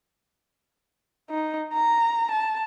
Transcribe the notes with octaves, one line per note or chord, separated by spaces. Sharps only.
D#4
A#5
A5